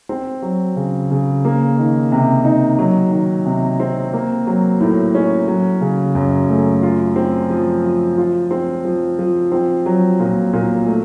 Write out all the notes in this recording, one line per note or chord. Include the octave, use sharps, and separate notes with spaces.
C4
F#3
C#3
C#3
A#3
D#3
C3
D#4
F#3
D#3
C3
C4
A#3
F#3
A2
C#4
F#3
C#3
F#2
A3
F4
C4
F3
F3
F4
C4
F3
F3
C4
F#3
A#2
A#2
A3